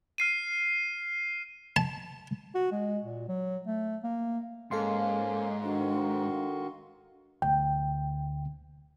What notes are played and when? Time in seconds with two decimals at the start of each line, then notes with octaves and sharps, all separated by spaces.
0.18 F6 C7 D#7
1.76 A5
2.55 F#4
2.72 G#3
3.04 A#2
3.28 F#3
3.67 A3
4.03 A#3
4.71 G#2 A#3 C#4 A4 F5 C6
5.63 D#3 D4 F#4
7.42 D2 G5